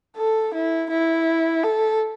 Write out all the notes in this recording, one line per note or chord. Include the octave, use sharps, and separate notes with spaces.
A4
E4
E4
A4